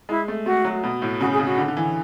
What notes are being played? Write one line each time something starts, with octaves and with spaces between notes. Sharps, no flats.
G#3 E4
A3
A3 F#4
F#3
B2
A2
C#3 F#4
G#4
C#3
F#4
D3
D3
E3